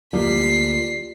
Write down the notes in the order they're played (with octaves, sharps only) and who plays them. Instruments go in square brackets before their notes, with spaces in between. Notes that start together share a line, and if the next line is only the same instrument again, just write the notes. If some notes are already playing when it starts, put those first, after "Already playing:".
[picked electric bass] D2 A#3 [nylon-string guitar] G3 [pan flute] F4 [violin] B6 C7